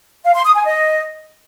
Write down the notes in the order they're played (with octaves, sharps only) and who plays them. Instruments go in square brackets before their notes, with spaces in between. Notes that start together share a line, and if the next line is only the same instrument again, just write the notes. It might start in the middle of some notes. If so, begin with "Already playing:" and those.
[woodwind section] F5
C6
D#6
G#5
D#5